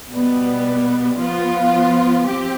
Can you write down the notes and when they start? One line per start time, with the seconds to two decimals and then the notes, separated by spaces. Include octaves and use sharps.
0.10 B2 G3 B3
1.18 F3 B3 F4
2.25 F3 C4 G4